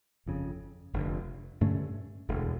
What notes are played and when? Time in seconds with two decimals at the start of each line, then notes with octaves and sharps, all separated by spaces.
0.26 G1 F2 C#3
0.93 F1 F2 D3
1.61 G2 D3 A3 C#4
2.28 E1 D2 D3